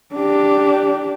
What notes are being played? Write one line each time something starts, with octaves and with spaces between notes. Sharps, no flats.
D4 G4